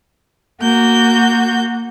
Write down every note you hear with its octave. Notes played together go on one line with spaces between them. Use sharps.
A#3 F#4 G6